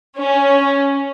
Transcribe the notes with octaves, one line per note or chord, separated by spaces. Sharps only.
C#4